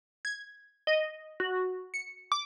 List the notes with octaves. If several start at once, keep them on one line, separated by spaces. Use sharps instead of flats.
G#6
D#5
F#4
C#7
D6